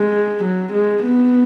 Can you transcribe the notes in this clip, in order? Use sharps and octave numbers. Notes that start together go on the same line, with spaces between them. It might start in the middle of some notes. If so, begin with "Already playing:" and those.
Already playing: G#3
F#3
G#3
B3